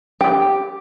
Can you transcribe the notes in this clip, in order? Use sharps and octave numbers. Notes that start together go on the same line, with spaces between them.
G4